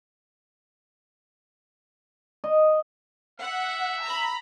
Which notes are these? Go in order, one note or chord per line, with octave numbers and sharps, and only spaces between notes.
D#5
E5 F#5
A#5 B5